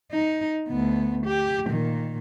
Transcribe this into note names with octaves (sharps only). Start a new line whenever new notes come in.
D#4
D2 B3
G4
A#2 D#3